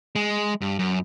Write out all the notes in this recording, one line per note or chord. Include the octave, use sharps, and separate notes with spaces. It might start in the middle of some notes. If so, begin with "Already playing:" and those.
G#3
G2
F#2